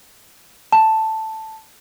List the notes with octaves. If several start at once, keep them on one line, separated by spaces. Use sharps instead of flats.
A5